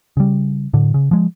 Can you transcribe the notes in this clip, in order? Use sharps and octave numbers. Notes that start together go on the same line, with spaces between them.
C#3 G3
A2 D3
C#3
F3 G#3